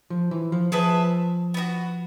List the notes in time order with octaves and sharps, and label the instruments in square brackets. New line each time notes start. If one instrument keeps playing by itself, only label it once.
[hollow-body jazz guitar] F3
E3
F3
[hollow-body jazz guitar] F3 [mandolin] G#4 B4 E5 A5
[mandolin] B3 D#4 F#4